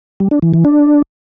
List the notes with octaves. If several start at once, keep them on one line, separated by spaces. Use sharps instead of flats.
G3
D4
E3
E3
D4